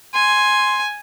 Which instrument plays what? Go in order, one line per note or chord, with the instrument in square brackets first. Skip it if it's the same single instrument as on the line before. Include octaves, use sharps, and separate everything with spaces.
[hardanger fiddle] G#5 [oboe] C6